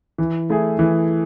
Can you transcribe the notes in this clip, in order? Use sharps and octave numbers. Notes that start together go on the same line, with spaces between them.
E3
A3 E4 G#4
E3